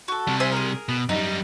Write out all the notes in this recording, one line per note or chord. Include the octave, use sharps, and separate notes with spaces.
F#4 A4
C3 G3
C5 E5 G#5
G#4 A#4
B2
F#2 G3 D#4